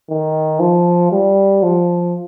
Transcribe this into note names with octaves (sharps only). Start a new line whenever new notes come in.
D#3
F3
G3
F3